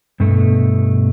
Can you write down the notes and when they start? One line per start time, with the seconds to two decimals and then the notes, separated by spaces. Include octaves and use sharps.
0.20 G2 B2 A3